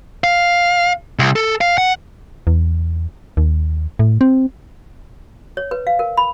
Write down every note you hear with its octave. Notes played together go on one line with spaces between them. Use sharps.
F5
C2
A4
F5
F#5
E2
D#2
A2
C4
C#5
B4
F5
A#4
B5